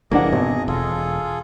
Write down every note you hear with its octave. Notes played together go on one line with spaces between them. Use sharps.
F1 E3 A#3 D4 G#4 D#5 F#5
G#1 B2
E1 F4 G#4 A4